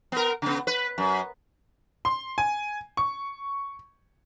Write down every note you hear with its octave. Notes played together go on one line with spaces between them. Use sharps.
B3 A#4
C#3 B3
B4
F#2
C6
G#5
C#6